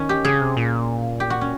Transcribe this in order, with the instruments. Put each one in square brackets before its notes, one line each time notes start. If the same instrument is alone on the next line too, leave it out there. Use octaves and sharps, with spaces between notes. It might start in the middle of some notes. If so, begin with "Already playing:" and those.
Already playing: [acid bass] D#3 [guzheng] C#4
[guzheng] G4
[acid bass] C#3 [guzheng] G#4
[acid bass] C3
A#2
[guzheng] G4
F#4
C#4